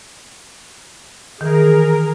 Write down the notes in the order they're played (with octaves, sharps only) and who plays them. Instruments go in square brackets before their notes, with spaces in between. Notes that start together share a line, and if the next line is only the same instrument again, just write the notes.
[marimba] D#3 E3 [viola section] G#4 A#4